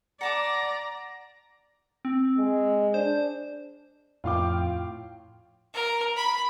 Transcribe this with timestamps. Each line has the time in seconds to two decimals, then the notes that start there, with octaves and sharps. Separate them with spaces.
0.21 D5 F#5 A5 A#5 D6
2.05 C4
2.38 G#3
2.94 D4 C5
4.24 F2 A2 F4 F5 G5 D6
5.74 A#4
6.16 B5